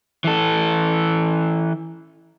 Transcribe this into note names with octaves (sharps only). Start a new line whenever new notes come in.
E3 A4